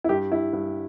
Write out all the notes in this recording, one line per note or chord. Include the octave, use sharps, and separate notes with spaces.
E4
G2 G4
E4
G2